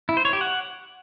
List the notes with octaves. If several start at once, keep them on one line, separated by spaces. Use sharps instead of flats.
E4
C5
C#5
G4
F#5